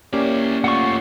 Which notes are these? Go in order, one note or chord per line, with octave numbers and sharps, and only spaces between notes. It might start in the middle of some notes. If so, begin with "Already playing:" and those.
A#3 C#4 E4 G4 D5
A3 F4 F#5 C#6